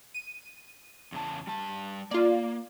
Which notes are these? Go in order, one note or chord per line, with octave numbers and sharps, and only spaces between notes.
D#7
E2 C#3 A5
G3 A5
A#3 F4 D5